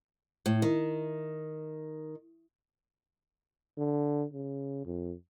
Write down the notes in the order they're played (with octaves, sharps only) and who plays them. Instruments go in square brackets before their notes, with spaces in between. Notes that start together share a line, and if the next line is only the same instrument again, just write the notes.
[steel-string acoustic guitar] A2
D#3
[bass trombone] D3
C#3
F2